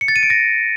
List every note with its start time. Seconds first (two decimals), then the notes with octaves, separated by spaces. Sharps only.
0.01 C#7
0.08 A6
0.16 D#7
0.23 D7
0.30 A#6